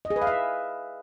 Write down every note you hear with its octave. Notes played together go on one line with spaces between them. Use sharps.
D#5
G#4
B4
F5
E5